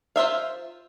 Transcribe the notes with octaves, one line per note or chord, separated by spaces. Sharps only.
F4 C5 E5 F5